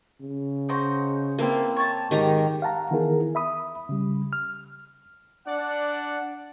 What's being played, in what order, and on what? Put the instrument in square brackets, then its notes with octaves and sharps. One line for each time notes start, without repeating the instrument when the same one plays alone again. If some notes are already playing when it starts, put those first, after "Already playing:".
[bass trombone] C#3
[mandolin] D#4 F#4 C5
[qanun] A#3 C4 [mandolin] E4 A4 B4
[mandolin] C#5 A5
[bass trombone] G#2 [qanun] D#3 G4 A#5
[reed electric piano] F5 F#5 A5 A#5
D#3 E3 B3 E4 G#4 A#4
E5 B5 D#6
C#3 G3
F6
[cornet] D4 [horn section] D5 F#5